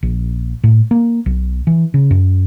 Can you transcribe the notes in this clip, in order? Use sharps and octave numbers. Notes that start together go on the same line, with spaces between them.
A#1
A2
A#3
B1
E3
C#3
F#2